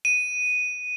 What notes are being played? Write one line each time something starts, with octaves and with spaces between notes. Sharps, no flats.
D#7